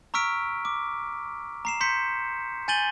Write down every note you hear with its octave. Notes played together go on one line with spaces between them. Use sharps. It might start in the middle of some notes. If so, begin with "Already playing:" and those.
A#5 C#6 E6 F6 B6 D7
D6
A#5 C7 E7
C6 G6 B6 C#7
G#5 G6 A6 D#7 F#7 G7